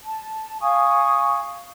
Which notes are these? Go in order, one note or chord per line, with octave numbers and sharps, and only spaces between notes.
A5
F5 G#5 C#6 D#6